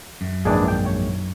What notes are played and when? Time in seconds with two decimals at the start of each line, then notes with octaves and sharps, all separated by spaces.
0.21 F#2
0.45 A#1 G#2 D#3 E3 D4 G#4
0.68 G5
0.86 C#5